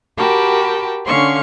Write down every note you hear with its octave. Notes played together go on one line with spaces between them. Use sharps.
F#4 G4 A#4 G5 A5 B5
D3 C#4 F5 C6 C#6